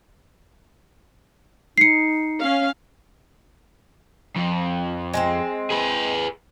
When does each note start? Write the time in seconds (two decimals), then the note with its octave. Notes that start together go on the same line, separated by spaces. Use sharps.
1.78 D#4 C7 C#7
2.39 C#4 F5
4.36 F2
5.13 G#3 B3 C4
5.70 G#4 B4